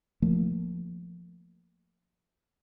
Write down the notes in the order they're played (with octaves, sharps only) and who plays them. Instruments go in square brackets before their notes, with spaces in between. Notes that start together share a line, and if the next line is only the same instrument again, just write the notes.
[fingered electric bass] F3 A3 A#3